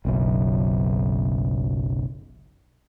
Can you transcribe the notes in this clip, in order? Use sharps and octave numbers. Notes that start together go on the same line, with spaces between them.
F#1 B1 F#2